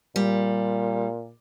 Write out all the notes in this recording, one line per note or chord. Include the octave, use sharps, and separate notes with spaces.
A#2 G3